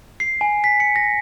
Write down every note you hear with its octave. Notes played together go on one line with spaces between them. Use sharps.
C7
G#5
B6
C#7
A#6